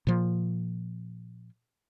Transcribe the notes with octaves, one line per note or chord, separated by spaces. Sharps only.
A#2 F3